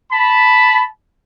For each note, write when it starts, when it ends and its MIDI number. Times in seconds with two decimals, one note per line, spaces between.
0.10 0.85 81
0.10 0.85 83